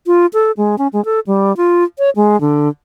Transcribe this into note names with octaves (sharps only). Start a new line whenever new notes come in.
F4
A4
G#3
C#4
G#3
A4
G3
F4
C#5
G#3
D3